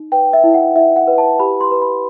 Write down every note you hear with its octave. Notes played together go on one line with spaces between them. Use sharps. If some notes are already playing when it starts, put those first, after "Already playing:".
Already playing: D#4
B4 G5
E5
E4
F#5
E4 E5
F#5
B4
A5
G4 B5
C6
B4
B5